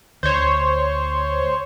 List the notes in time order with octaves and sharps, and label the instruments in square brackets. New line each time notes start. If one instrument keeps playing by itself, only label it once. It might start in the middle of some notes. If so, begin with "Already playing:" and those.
[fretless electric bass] D2 [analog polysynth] C5 C#5